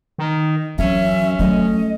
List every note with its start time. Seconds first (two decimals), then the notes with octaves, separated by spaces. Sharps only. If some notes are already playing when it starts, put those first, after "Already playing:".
0.18 D#3
0.78 F#2 E3 C#4 E5
1.39 F#3 A3 D#5